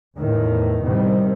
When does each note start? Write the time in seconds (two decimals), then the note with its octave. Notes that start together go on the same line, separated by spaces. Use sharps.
0.17 E2 A2 D#3
0.82 A1 C3 D#3 G3